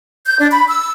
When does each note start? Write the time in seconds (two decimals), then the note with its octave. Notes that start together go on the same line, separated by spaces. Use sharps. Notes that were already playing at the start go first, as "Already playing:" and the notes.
0.25 G6
0.39 D4
0.52 B5
0.68 E6